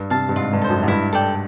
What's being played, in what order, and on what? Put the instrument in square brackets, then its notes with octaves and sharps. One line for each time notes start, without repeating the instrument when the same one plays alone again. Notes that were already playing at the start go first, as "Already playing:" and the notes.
Already playing: [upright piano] G2
[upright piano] C3 [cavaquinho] F5 A5
[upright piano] G2
[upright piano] G#2 [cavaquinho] F4
[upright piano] G2
[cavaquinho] A4 C5
[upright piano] F#2
G#2
[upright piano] G2 [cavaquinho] E4
[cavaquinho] A4 D5 G5